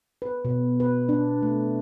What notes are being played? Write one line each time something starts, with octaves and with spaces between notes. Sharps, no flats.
B4
B2
B4
D4
A3